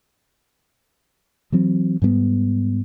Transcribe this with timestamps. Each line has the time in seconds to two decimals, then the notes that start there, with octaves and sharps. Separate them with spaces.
1.52 E3 F#3 C4
2.02 G#2 G3 A#3 B3